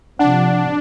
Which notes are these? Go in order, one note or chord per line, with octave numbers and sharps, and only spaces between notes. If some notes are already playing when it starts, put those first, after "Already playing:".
C3 F3 D4 F#5 A5